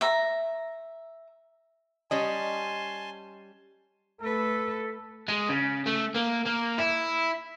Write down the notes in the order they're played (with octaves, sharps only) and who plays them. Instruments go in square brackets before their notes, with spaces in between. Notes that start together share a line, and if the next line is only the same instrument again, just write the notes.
[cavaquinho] E5 A#5
[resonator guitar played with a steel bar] G3 C#4 D#5 [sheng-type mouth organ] G#5 A5 C6
[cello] A3 B4 [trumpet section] A4
[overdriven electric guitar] G#3
C#3
A3
A#3
A#3
E4